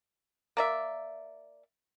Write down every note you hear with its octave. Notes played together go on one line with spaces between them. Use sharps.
A#3 D5 E5